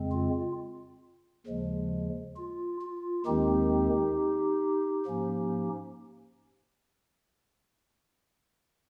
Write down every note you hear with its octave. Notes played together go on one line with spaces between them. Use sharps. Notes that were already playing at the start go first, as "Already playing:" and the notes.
Already playing: F2 C#3 G#3 C4
F4
D#2 C#3 F3 G#3
F4
F4
D#2 D#3 G#3 C4 D#4 G4
G#2 F3 A#3 C#4